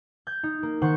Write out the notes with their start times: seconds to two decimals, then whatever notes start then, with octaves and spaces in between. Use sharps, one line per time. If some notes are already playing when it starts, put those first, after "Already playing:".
0.27 G6 G#6
0.43 D#4
0.63 A#3
0.81 D#3 C5 F#5 C#6 G6